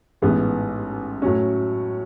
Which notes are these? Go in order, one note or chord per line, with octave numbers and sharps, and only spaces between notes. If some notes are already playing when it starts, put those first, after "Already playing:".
A1 G#2 E3 B3
A2 F#3 C#4